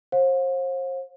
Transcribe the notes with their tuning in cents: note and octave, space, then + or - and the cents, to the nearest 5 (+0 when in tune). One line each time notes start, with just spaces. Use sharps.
C5 +35 F5 +40